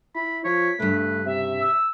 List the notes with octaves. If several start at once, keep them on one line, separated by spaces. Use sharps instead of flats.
E4 B5
F3 C#5 B6
G2 C#3 A3 B4
C3 E5
E6